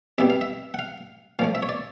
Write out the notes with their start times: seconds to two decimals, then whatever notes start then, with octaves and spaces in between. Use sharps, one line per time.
0.18 C2 B2 G3 B3 E5
0.30 F5
0.41 E5
0.74 F#5
0.79 F5
1.39 A#2 F3 A3 F5
1.55 E5
1.62 C#5
1.69 D5